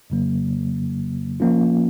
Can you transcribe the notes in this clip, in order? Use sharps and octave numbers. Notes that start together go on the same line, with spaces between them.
F2 C#3 F#3 A#3
F3 A#3 C#4 F4